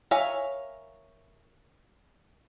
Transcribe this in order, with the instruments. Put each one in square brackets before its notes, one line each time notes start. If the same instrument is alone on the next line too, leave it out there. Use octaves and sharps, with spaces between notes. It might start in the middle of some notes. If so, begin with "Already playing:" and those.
[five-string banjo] A#4 C#5 E5 F5 G#5